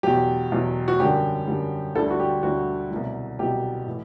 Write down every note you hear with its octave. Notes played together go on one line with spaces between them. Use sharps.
E2 B2 F#3 G4
E2 B2 F#3
F#4
F#2 D3 G3 G4
F#2 D3 G3
D2 D3 G3 A4
F#4
G4
D2 D3 G3 F#4
C2 B2 F#3
C2 B2 F#3 G4
A2 E3